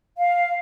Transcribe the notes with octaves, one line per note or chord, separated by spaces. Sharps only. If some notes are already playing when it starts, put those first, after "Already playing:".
F5